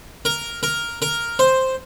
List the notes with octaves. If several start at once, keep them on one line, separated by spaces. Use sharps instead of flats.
A#4
A#4
A#4
C5